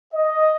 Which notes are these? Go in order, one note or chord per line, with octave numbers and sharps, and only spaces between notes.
D#5